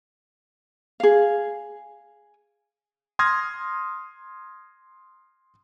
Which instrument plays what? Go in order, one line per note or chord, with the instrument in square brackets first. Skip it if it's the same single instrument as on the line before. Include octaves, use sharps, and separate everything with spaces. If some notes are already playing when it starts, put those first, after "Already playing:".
[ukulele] G#4 F5
[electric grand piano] C6 D#6 F6 G#6 A#6